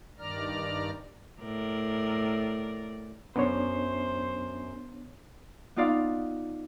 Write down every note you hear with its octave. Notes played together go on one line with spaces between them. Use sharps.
G2 D#3 D5 A#5 F6
A2 A#4 D5
F#2 B3 D4 C5 C#5
B3 D#4 F4 D5 F5